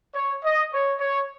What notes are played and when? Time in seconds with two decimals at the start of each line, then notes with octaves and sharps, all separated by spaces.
0.14 C#5
0.43 D#5
0.72 C#5
1.00 C#5